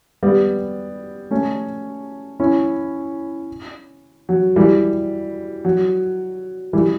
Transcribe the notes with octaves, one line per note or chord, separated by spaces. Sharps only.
G3 B3
A3 C#4
C#4 E4
F#3
E3 G3
F#3
E3 G3